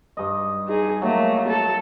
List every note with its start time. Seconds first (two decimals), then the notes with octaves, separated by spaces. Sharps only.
0.17 G2 D#5
0.67 D#4 G#4
1.02 F#3 A3 A#3
1.47 A4